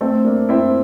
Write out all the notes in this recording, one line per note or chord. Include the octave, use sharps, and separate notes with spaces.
A3 C4
A#3 D4
C4 E4